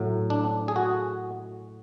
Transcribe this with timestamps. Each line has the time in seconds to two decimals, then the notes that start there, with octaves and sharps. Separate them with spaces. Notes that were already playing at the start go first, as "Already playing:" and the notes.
Already playing: A2 F#3
0.30 D4
0.68 G#4
0.76 F#4